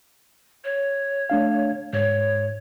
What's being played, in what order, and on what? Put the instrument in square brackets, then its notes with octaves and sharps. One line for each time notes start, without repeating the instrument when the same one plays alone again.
[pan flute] C#5
[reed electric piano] A3 D4 F5
[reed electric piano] G#2 [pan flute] C#5